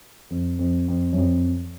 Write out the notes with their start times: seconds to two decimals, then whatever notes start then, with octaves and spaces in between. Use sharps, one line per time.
0.30 F2
0.59 F2
0.88 F2
1.13 F#2
1.18 F2